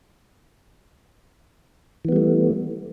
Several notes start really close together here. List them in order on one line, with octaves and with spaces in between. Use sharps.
E3 B3 G3 A3